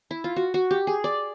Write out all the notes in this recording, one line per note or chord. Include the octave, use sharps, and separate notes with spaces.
E4
F4
F#4
F#4
G4
G#4
D5